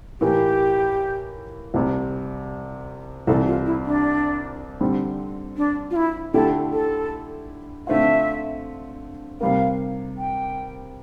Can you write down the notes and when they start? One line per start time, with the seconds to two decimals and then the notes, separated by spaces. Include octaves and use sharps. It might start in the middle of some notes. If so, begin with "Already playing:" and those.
0.21 A2 E3 A#3 G4
1.74 C2 C3 G3
3.27 C2 C3 E3 A4
3.47 F4
3.66 E4
3.85 D4
4.81 D3 G3 C4
5.57 D4
5.91 F4
5.96 E4
6.34 D3 A3 E4 G4 A4
6.73 A4
7.87 D3 A3 C4 F4 E5
9.41 C3 G3 A#3 F5
10.18 G5